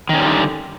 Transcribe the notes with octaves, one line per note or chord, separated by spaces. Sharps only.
D3 D#3 F3 G3 C#4